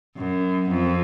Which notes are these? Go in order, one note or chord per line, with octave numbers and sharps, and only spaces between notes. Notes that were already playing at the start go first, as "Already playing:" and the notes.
F#2
F2